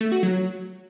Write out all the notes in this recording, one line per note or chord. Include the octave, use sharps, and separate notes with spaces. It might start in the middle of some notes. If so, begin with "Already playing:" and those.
A3
F#4
F#3